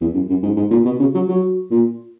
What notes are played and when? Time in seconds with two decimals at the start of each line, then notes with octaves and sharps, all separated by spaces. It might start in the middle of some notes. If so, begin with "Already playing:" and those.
0.01 E2
0.14 F#2
0.29 F#2
0.43 G#2
0.56 G#2
0.71 A#2
0.85 B2
1.00 C#3
1.14 F#3
1.29 F#3
1.71 A#2